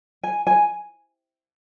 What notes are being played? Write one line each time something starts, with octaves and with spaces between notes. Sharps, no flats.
G#5
G#5